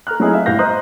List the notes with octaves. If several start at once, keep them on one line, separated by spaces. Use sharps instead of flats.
A4 A#5 F6 F#6
F#3 A3 C4 D#4 E4 G#4
E5 F5
G1 A2 G4 F5 G6 A#6
C5 D#5 A#5 C6 D#6 F#6